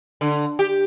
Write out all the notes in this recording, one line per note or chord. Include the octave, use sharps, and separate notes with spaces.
D3
G4